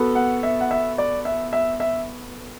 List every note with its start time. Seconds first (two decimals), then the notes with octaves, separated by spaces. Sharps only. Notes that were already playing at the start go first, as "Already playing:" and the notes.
Already playing: B3 F#4 A4
0.15 F#5
0.43 E5
0.61 F#5
0.71 E5
0.98 D5
1.25 E5
1.53 E5
1.80 E5